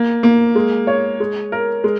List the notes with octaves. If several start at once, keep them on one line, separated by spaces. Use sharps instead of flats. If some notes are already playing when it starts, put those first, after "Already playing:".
Already playing: A#3
A#3
G#3
C#5
G#3
A#4
G#3